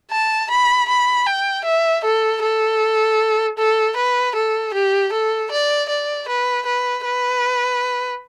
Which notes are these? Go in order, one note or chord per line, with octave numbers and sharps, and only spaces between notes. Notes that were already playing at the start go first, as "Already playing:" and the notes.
A5
B5
B5
G5
E5
A4
A4
A4
B4
A4
G4
A4
D5
D5
B4
B4
B4